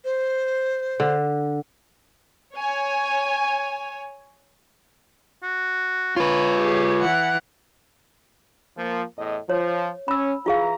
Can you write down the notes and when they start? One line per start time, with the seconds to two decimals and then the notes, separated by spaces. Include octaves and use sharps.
0.05 C5
1.00 D3
2.56 C#5 G#5
5.43 F#4
6.16 F4 B4 C#5
6.57 G4 G#4
7.00 E3 F#5
8.78 F3 A#3
9.18 E2 A2 D#5
9.50 F3 C#5
10.08 C#4 B5 E6
10.46 E3 F4 G#4 F5 A#5